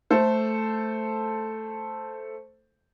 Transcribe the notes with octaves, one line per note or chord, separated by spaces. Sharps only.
A3 A4 C5